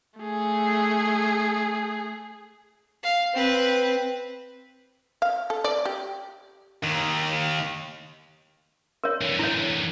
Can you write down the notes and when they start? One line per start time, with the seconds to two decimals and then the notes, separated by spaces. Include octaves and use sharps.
0.20 A3 G#4
3.03 F5
3.34 C4 B4
5.22 F5
5.50 A4
5.64 D5
5.85 G4
6.84 D#2 D#3
9.04 A#4 C#5
9.21 D3 E3
9.39 E4 C#5